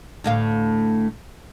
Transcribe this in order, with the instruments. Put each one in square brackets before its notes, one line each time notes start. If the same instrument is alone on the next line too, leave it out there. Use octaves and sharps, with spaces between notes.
[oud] D2 A2 F5